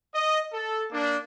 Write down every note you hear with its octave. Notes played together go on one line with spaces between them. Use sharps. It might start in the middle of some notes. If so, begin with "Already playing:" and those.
D#5
A4
A#3 D4